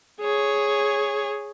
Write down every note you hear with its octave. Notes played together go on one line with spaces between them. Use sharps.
G#4 C#5